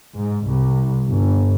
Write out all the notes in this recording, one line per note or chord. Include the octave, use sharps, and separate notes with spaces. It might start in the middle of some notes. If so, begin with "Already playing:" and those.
G#2
C2
G1